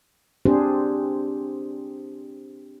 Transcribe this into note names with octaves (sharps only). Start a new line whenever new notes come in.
C4 D4 G4 G#4 C5